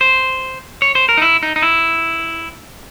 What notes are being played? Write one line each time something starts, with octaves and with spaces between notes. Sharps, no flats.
C5
C#5
C5
A#4
D#4
E4
D#4
D#4
E4